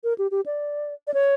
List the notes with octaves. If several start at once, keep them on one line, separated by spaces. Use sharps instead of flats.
A#4
G4
G4
D5
D5
C#5